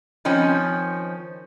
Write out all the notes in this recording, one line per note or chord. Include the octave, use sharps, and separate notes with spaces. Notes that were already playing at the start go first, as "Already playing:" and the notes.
D#3 F3 C4 C#4